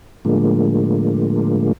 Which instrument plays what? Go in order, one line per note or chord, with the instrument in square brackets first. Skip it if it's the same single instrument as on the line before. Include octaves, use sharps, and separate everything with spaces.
[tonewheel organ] A2 D3 F3 G#3 A#3